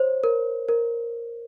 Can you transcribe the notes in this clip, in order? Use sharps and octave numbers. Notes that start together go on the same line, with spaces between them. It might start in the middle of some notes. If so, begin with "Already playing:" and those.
Already playing: C5 C#5
A#4
A#4